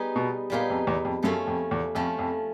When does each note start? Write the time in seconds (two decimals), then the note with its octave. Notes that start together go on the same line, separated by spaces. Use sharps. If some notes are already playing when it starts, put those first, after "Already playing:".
Already playing: G3 B3 D#4 G#4
0.16 B2
0.50 A#2 G3 B3 D#4 G#4
0.70 F2
0.87 E2
1.05 F2
1.23 F#2 F3 A3 C#4
1.47 F2
1.71 E2
1.95 F2 F3 A3 C#4
2.19 F2